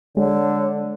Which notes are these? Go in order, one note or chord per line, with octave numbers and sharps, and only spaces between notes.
D3 G#3 C#5